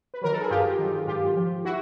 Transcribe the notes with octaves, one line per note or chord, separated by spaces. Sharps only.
B4
D#3 F#3 A#4
A4
G#4
G2 F4 G4
D#3 F#3
G#2 F4 G4
F3
E4 F#4